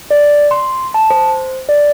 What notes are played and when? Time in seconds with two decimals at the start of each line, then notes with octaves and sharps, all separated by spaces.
0.11 D5
0.51 C6
0.94 A5
1.10 C5
1.69 D5